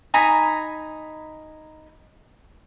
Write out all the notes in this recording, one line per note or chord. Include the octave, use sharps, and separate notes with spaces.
D#4 G#5 A#5 B5